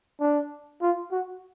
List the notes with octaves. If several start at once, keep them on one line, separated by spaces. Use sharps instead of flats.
D4
F4
F#4